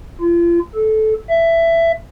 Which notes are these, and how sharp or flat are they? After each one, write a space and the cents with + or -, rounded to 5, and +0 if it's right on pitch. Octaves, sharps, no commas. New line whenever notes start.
F4 -35
A4 -15
E5 +15